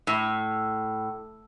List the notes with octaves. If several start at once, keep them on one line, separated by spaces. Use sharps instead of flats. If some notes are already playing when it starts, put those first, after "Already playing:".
A2